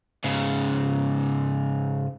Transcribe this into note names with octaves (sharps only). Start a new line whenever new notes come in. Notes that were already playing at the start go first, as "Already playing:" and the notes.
G#2 C#3